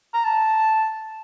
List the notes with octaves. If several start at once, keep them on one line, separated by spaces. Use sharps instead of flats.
A#5
A5